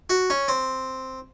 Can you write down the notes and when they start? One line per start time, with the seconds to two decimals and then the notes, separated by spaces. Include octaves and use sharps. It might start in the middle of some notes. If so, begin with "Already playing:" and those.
0.10 F#4
0.30 C#4
0.48 C4